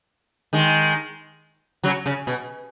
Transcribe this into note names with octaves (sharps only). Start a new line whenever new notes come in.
D#3 G#3
C#3 F#3
C#3
B2